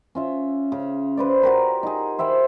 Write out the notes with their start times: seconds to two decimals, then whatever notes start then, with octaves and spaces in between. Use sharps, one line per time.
0.15 C#4 F4 E5
0.72 C#3
1.17 B4 C5 D5
1.43 F#4 G4 A#4
1.83 D#4 G#4
2.19 C5 E5 G5 B5